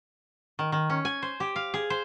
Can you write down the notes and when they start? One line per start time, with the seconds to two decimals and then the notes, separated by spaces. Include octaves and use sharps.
0.59 D#3
0.72 D#3
0.90 C#4
1.05 G#5
1.22 C5
1.40 G4
1.56 F5
1.74 G#4
1.90 C5